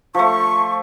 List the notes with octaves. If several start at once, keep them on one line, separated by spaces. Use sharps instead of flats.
F3 A3 C#6